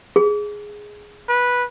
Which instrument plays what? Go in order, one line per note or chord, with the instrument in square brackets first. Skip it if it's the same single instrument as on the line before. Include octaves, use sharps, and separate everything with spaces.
[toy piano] G#4
[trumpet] B4